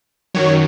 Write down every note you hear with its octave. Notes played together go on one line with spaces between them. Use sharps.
F#2 D#3 F#3 C#5